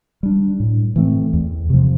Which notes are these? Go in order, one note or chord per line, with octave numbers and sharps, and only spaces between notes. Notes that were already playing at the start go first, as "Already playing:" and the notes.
G3 D4
A2
E3 A3 C4
E2
C3 F3